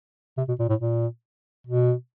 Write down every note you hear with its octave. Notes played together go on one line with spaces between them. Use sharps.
C3
B2
A#2
A2
A#2
B2